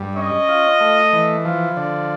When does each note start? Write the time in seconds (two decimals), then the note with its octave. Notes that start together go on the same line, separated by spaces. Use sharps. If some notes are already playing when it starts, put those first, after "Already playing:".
Already playing: G2
0.16 C#4 D#5
0.48 F4
0.80 A3
1.13 E3
1.45 F3
1.77 D3